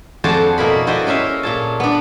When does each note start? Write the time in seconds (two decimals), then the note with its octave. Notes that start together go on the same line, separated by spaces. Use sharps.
0.24 F2 F#4 G#4 C5 D5 A5
0.58 B2 A#3 E4 A#4 B5
0.87 E4 F#4 C5 D5 D#5
1.07 C#4 A#4 E5 F5
1.43 A#2 G#4 A5
1.80 B3 D4